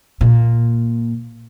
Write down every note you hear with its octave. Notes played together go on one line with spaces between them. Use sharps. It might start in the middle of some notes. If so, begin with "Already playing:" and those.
A#2